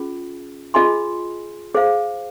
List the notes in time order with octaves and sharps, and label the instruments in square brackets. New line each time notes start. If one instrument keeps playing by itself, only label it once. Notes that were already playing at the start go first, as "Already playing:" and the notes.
Already playing: [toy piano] C#4 F4 G#4
F4 G#4 D#5 G#5 C6
G#4 C5 F5